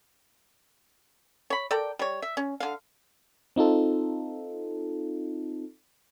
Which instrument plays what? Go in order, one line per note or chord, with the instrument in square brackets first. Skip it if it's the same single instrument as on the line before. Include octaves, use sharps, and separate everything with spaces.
[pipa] C#5 B5
A4 A#4 D5 G5
G3 C#5
E5
C#4
D3 F5
[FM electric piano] C4 D#4 F4 A4